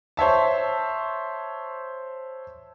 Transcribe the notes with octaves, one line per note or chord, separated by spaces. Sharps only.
C5 C#5 E5 A5